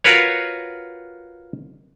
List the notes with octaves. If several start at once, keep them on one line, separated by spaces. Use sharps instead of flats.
F4 F#4 A#4 B4 C#5